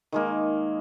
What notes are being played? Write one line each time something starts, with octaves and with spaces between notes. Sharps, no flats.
D#3 G#3 A#3